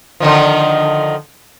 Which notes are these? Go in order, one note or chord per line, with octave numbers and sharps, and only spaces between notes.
D3 D#3 F3